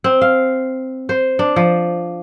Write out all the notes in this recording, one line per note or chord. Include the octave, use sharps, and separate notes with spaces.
C4
F5
C5
D4
F3